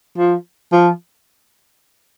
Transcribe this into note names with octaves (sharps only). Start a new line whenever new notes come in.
F3
F3